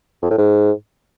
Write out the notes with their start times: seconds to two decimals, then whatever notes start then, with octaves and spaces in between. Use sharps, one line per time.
0.23 F2
0.31 A2
0.38 G#2